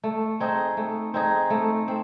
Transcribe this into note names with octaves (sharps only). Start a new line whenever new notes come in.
A3
C4 D#4 G#4
A3
C4 D#4 G#4
A3
C4